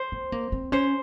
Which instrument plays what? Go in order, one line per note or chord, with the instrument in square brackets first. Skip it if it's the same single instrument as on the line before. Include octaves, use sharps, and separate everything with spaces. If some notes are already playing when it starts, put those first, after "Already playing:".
Already playing: [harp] C5
[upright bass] C4
A#3
C4
[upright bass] C#4 [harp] C5